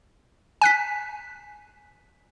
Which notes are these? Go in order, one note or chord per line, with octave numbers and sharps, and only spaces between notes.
G#5 F#6 B6